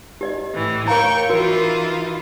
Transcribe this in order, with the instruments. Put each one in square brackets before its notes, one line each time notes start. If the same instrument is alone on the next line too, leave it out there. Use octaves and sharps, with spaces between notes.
[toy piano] G4 D5 D#5
[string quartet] A2 E3
[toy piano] A#4 F5 A#5 [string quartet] C#5 G5 C#6
[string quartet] E3 D#4 F4 [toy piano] F#4 A#4